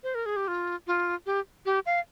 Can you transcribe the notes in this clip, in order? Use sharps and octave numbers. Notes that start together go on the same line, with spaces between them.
C5
A#4
G#4
G4
F4
F4
G4
G4
F5